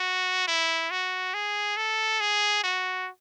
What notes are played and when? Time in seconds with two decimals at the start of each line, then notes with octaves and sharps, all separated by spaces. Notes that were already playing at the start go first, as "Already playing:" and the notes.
Already playing: F#4
0.48 E4
0.91 F#4
1.34 G#4
1.77 A4
2.21 G#4
2.63 F#4